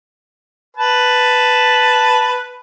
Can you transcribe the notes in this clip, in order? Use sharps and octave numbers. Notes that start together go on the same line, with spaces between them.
B4 A5